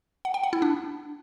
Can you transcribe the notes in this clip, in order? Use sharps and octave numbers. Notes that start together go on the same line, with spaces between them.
F#5
G5
F#5
E4
D4